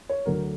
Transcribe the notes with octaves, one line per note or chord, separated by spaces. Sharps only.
C#5
D2 D3 F#3 A#4